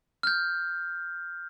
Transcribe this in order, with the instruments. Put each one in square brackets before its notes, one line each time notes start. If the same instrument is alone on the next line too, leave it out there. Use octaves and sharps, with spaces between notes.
[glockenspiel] F6 G6